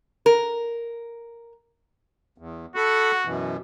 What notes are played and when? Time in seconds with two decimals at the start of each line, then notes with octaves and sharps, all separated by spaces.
0.26 A#4
2.38 E2
2.76 F#4 A4 F#5 B5
3.25 F#2 B2 E3